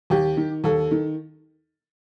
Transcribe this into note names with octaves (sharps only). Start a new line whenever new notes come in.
D#2 G4
D#3
D#2 A4
D#3